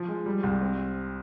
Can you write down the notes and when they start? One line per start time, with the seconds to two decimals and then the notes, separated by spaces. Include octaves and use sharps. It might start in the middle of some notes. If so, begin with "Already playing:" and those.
Already playing: F3
0.08 G#3
0.26 G3
0.43 C2
0.61 C4